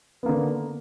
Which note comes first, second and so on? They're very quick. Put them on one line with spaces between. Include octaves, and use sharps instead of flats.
B3 A#3 D3